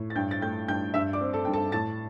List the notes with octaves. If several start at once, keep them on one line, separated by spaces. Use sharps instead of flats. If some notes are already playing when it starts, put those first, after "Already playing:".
Already playing: A2
A6
G2 G5 G6
A6
A3 G5 G6
G2 G5 G6
G2 E5 E6
D5 D6
C4
A4 A5
G2 G5
A4 A5
A2 A5 A6